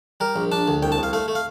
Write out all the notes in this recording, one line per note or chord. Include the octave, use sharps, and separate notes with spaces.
G3 A#4
A#1
D4 A5
D2
C2 G5
A5
C2 F5
A3 F5
A3
F5